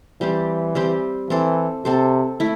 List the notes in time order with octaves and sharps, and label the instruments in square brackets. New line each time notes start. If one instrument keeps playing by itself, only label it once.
[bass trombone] E3 [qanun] G3 C4 G4 C5
[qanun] G3 C4 G4 C5
[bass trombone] E3 [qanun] C4 A4 C5
[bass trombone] C3 [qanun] C4 A4 C5
[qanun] A3 E4